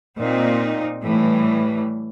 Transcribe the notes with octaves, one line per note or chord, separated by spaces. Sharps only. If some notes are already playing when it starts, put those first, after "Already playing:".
A#2 C4 D#4
A2 E3 G3